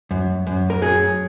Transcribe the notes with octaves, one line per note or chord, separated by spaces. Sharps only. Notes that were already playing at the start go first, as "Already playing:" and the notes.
F#2
F#2
A#4
F#3 G#4